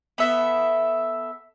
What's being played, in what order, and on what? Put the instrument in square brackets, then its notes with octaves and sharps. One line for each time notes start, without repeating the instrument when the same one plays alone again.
[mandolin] B3 A4 E5